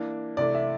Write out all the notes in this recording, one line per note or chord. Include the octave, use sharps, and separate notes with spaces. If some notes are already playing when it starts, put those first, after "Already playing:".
Already playing: E3 A#3 D4
C3 E3 A3 D5
E5